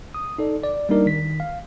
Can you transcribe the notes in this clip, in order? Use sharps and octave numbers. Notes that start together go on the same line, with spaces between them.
D#6
D#4 A4 D5
D5
G3 A#3 D4 D#4 A#4 D5
D#3 B6
F5